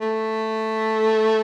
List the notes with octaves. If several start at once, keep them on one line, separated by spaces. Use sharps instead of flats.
A3